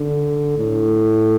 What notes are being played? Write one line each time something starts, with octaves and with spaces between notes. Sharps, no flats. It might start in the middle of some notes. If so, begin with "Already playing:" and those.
Already playing: D3
A2